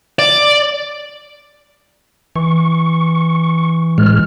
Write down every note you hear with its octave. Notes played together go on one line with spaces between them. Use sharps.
D5
E3 C#6
A2 G#3 F6